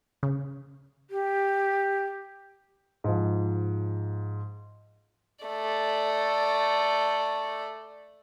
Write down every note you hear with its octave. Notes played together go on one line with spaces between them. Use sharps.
C#3
G4
G#2 F3
A3 D5